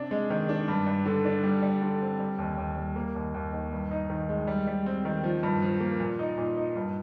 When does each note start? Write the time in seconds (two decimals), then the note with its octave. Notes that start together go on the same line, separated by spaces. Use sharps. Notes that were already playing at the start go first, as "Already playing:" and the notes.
Already playing: C3 D4
0.11 G#3
0.30 D#3
0.49 D4
0.68 G2
0.86 G2
1.06 D3
1.25 D4
1.44 G3
1.62 G3
1.82 D3
2.01 C4
2.20 G3
2.38 D#2
2.58 D#2
2.77 G3
2.96 A#3
3.15 D#2
3.34 D#2
3.53 D#3
3.72 G2
3.91 D#4
4.10 D#3
4.29 G#3
4.47 G3
4.67 G3
4.86 C4
5.05 D#3
5.23 F3
5.43 G2
5.62 F3
5.80 A#3
6.00 A#2
6.19 D#4
6.38 A#2
6.57 D#4
6.76 G2